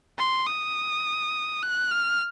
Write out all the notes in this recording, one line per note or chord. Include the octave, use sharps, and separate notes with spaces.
C6
D#6
F#6
F6